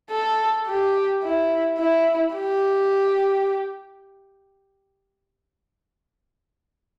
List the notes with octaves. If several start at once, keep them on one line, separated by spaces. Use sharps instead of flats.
A4
G4
E4
E4
G4